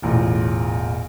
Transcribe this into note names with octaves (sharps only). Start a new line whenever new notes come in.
E1 A1 A#2